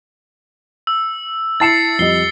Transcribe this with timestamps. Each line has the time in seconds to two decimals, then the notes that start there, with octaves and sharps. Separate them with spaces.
0.87 E6
1.60 E4 A5 A6 C7 C#7 E7
1.99 F2 G3 D#5 C7 G7